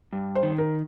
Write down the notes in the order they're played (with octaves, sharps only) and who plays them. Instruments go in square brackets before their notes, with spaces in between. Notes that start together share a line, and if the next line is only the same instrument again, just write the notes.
[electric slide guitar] G2
[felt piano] C5
[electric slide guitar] D#3
[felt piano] A#4